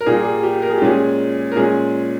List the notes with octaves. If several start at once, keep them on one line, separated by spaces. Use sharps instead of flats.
A#4
A#2 G3 A#3 G#4
G#4
G4
A#4
G#4
G4
A#2 G#3 C#4 G#4
A#4
A#2 G#3 C#4 G#4